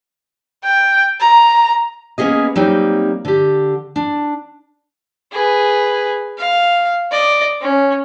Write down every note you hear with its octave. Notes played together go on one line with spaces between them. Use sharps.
G5
A#5
A#3 B3 C#4 G#4 D#5
F#3 G3 A#3 C4 D#4
D3 G4
D4
G#4 B4
F5
D5 D#5
C#4